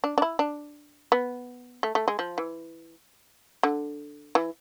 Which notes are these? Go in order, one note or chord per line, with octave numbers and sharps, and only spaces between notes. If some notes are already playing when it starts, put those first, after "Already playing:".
D4
D4
E4
D4
B3
A3
A3
G#3
F3
E3
D3
E3